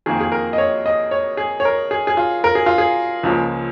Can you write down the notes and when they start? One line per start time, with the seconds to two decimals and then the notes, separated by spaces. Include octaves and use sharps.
0.06 F2 D#3 A#3 G#4
0.20 G#4
0.32 A#4
0.53 D#5
0.58 C#5
0.86 D#5
1.11 C#5
1.37 G#4
1.60 C#5
1.65 A#4
1.91 G#4
2.07 G#4
2.17 F4
2.44 A#4
2.55 G#4
2.66 F4
2.78 G#4
3.23 C#2 C#3 F3 A#3